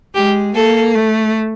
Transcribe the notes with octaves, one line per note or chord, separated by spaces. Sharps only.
G#3 G4
A#3 A4
A3